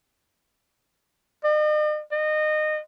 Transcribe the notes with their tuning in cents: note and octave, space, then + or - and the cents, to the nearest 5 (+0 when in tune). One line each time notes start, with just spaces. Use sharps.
D#5 -45
D#5 -25